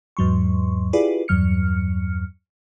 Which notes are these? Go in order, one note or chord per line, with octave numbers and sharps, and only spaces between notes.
E2 G#2 F#3 C6 C#6
E4 F4 G4 G#4 B4 D5
E2 G2 F#3 F6 C#7